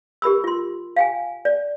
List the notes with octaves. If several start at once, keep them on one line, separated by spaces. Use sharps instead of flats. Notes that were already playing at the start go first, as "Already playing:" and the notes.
G4 A#4 B5 E6
F4 C6
F5 G5 G#5
D5